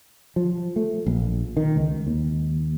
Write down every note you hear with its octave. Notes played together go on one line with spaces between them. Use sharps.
F3
A3
A#1
D#3
C#2
D#2